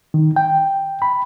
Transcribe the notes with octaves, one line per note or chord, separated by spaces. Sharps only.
D#3
G5
B5